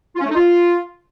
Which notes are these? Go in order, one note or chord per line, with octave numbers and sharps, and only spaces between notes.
F4
C#4
A3
D#4
F4